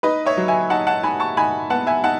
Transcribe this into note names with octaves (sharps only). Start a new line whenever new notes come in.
D#4 B4 D#5
C#5 E5
F#3
E5 G#5
D#4 F#5 A5
F#5 A5
D#4 G#5 B5
A5 C#6
D#4 G#5 B5
B3 F#5 A5
E5 G#5
D#4 F#5 A5